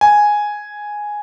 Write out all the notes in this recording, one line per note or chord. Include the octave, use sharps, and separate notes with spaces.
G#5